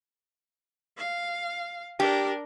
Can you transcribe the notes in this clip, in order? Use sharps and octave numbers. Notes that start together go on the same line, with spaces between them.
F5
D4 G4 A#4